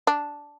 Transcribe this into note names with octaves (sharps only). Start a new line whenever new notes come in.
D4